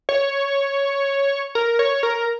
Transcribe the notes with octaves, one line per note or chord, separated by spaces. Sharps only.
C#5
A#4
C#5
A#4